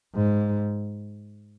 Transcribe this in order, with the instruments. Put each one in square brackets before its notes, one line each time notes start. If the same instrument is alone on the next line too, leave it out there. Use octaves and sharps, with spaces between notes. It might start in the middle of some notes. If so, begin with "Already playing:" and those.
[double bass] G#2